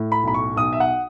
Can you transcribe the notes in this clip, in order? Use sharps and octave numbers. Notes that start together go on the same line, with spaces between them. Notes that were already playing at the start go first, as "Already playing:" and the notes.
Already playing: A2
B5
B1 B5
C#6
B1 D#6
E5
F#5